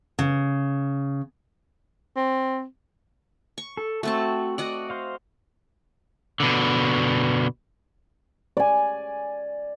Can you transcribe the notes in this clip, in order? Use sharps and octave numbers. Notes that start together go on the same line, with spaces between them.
C#3
C4
C#6
A4
A3 C4 F#4 A5
F#4 D5 D#5 F#5
C5 F5
B2 D3
D5 G#5